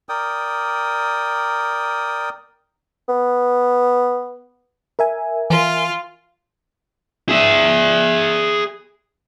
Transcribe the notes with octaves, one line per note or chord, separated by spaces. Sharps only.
A#4 D5 G5 D#6
B3
A#4 E5 G#5
E3 F4
G#4 E5